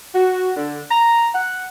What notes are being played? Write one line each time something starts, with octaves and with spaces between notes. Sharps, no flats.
F#4
D3
A#5
F#5